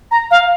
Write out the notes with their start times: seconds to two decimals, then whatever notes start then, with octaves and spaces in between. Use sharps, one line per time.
0.11 A#5
0.31 F5